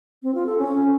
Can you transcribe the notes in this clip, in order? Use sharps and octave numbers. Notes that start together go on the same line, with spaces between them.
C4
F4
A4
C#4